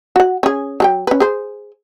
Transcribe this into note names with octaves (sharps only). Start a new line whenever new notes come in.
F#4 F#5
C#4 G#4
F#3 A4 G5
C#4 B4
G#4 C5